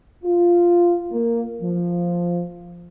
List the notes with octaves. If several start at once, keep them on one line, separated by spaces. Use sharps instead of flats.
F4
A#3
F3